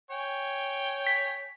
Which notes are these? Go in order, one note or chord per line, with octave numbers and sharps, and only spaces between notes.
C#5 G5 G#5
B6